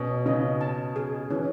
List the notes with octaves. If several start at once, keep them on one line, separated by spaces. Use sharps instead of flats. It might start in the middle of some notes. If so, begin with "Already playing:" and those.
Already playing: B2 C#4
C#3 D#5
A5
G#4
E3 C#4